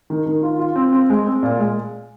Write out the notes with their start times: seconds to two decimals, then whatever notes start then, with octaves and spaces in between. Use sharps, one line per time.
0.10 D#3
0.26 D#3
0.43 F4
0.59 F4
0.76 C4
0.93 C4
1.10 G#3
1.26 C4
1.43 A#2
1.59 G#3